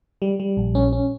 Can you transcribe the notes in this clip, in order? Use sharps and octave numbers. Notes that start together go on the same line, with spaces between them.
G3
G3
A#1
C#4
C#4